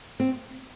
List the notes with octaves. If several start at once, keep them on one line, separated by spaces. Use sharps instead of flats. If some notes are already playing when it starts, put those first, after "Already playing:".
C4